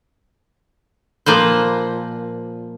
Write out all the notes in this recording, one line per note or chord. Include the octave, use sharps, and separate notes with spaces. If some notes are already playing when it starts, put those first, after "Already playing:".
A#2 F3 A#3 B4 C5